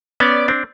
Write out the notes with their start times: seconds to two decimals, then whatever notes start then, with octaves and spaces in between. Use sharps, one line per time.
0.20 B3 C#4 D5
0.48 C4 D4